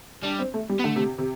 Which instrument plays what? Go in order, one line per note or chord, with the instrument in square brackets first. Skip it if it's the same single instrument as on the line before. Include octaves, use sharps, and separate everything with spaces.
[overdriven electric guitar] G3 [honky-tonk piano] D4
[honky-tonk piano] C4
A3
G3
[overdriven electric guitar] B3
[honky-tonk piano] D3 [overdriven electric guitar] A3
[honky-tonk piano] C3
C3